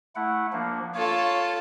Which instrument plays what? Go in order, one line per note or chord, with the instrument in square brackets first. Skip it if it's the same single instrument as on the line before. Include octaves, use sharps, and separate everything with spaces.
[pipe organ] A3 E4 F#5
F3 A#3 D4
[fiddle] F4 A4 [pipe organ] C#5